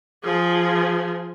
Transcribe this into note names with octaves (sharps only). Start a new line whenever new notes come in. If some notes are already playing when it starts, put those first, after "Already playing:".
F3 G#4